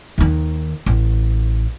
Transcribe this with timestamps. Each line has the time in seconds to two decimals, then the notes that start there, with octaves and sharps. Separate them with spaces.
0.18 D#2 D#3
0.86 A1